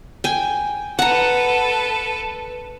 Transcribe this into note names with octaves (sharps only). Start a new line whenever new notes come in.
G5 G#5
A4 B4 F#5 A#5